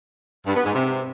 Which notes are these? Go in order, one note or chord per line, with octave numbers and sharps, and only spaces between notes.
G2
B3
G#2
C3